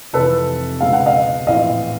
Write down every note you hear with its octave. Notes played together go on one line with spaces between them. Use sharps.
F1 F2 C3 E3 A4 B4
C#2 B2 G#3 B3 F5
F#5
D#5 F5
A#1 A2 E3 A3 C4 D#5 F5